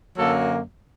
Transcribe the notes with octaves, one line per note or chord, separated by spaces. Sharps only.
F#2 D3 F#3 A#3 A4